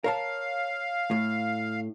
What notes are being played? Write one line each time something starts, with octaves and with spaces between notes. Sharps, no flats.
A#4 C#5 F5 A5
A2